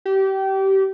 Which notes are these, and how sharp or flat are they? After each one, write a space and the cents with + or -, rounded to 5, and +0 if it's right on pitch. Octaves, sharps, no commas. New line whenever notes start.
G4 -25